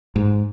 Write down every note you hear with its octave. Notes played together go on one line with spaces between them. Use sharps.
G#2